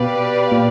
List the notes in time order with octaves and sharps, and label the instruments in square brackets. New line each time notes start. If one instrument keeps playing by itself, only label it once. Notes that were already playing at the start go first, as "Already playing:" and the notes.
Already playing: [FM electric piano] B2 [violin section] G4 B4 D5 F5
[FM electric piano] A#2